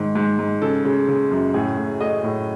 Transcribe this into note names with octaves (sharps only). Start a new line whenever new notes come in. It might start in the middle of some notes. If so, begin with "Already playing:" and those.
Already playing: G#2 D#3
G#2
G#2
C#3 A4
C#3
C#3
F#2
A2 G#4
A2
A3 D#5
A2